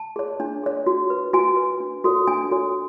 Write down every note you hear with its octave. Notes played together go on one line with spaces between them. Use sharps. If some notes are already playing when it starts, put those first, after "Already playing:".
Already playing: A5
G#4 C#5
D4
G#4 C#5
F#4
B4
F#4 G#5
B4
D4
F#4 A4 C#5
D4 G#5
F#4 A4 C#5